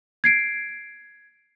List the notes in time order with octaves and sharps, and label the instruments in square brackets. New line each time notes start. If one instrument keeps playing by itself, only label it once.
[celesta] G#6 C7 D7